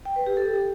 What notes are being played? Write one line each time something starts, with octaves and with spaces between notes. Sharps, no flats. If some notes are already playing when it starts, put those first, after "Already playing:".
G5
B4
G4
A4